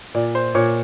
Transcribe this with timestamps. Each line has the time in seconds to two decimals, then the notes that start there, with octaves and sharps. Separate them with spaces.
0.14 A#2 D5
0.35 C5
0.55 A#2 C#5